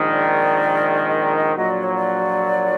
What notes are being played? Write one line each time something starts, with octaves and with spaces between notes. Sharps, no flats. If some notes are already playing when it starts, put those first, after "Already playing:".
Already playing: A#1 G#2 D#3
D5
D#5
D5
D#5
A#1 A#2 F#3 D#5
D5
C#5
D5